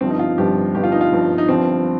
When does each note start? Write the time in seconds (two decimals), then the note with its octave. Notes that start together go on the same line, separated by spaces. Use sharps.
0.01 G1 G2 F3 C4
0.10 D#4
0.19 F4
0.38 G1 G2 F3 G4
0.74 G1 G2 F3 G4
0.84 F4
0.92 D#4
1.01 F4
1.12 G1 G2 F3
1.38 D#4
1.48 G1 G2 F3 C4